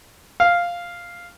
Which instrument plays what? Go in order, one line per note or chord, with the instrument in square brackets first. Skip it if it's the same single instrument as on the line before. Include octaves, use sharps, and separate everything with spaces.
[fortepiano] F5